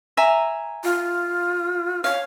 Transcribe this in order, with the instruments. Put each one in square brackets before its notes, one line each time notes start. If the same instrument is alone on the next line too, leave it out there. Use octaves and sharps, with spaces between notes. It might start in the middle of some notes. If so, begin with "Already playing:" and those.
[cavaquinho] E5 G#5 A#5
[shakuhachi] F4
[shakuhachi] C#5 [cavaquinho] F5